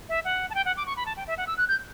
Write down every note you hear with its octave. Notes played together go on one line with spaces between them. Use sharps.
E5
F#5
A5
G5
F#5
D6
C#6
B5
A5
G5
E5
F#5
E6
F#6
G6